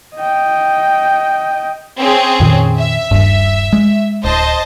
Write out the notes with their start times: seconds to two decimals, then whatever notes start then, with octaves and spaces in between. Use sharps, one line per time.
0.16 D#5 G5
2.00 C4 C#4 G#4
2.40 F2 A#2 D#3
2.79 E5
3.11 D#1 G2
3.73 G#3
4.25 D1 C5 D#5 A5